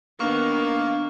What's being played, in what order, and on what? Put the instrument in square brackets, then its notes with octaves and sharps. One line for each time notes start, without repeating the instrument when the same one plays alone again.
[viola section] D#3 B3 [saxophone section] A#3 [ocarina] D4 [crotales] C#6 F6